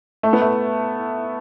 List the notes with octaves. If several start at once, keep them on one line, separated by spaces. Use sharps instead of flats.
A3
B3
A3